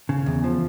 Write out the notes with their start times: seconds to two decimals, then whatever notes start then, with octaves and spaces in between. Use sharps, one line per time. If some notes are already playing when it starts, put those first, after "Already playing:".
0.09 C#3
0.26 E2
0.44 F3